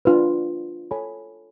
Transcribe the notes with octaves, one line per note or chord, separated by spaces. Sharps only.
D4 F4 B4
A4 C#5 G#5 B5